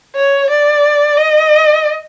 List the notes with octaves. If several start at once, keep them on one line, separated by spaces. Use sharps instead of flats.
C#5
D5
D#5